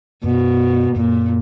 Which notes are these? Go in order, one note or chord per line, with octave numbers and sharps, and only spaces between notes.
F#2 B2
F#2 A#2